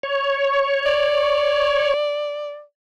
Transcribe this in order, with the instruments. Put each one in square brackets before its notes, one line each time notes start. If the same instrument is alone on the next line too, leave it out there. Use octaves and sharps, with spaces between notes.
[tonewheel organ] C#5
[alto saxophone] D5